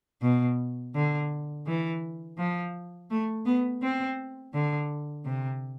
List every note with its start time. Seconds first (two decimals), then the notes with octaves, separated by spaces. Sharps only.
0.22 B2
0.95 D3
1.67 E3
2.38 F3
3.11 A3
3.46 B3
3.83 C4
4.54 D3
5.25 C3